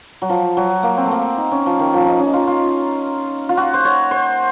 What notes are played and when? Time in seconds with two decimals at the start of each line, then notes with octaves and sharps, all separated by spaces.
0.22 F#3
0.29 F3
0.57 F#3
0.83 A#3
0.97 C4
1.06 A3
1.11 A#3
1.38 D#4
1.52 C#4
1.66 F3
1.79 D#3
1.93 F3
2.06 D#4
2.19 C#4
2.34 F4
2.47 F4
3.49 F4
3.57 F#4
3.74 C5
3.85 C#5
4.11 C5